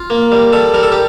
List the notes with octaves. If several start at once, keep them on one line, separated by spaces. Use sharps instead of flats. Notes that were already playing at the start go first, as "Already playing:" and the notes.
Already playing: F4
A#3
G3
G3 A4
G3 A#4
A4
G4